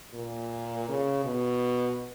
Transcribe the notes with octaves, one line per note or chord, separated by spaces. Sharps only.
A#2
C#3
B2